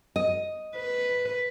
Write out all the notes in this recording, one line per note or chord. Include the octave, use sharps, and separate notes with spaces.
D#5
B4